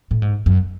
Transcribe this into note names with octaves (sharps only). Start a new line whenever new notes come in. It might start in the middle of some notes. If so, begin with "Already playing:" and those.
A2
G#2
F#2